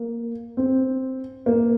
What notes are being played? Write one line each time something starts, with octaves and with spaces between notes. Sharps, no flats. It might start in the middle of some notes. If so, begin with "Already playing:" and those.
Already playing: A#3
C4
A#3